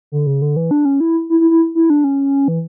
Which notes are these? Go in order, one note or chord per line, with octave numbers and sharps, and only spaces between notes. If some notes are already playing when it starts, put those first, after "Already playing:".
D3
C#3
D3
E3
D4
C#4
E4
E4
E4
E4
E4
D4
C#4
E3